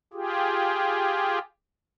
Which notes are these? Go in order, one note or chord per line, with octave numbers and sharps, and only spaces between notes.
F4 G4 G#4